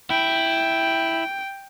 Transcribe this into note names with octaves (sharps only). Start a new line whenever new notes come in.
E4 G5